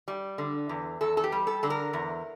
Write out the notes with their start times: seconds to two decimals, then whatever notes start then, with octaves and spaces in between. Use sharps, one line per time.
0.08 G3
0.38 D3
0.69 E2
1.01 E2 A4
1.17 A4
1.24 G4
1.32 G3
1.47 A4
1.63 D3 A4
1.70 A#4
1.93 E2